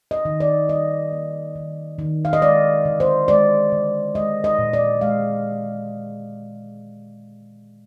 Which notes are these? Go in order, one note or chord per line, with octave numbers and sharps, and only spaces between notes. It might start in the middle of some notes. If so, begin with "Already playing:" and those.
D#5
D#3
D5
G3 D#5
A#3
D#3
D#3
F5
D#5
G#3 D5
D3
C5
G#3 D5
D3
G#3 D#5
D#5
A#2
D5
G#3 F5